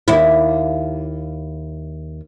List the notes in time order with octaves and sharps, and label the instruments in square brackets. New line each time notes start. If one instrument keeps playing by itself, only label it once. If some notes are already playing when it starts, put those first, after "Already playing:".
[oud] D#2 E4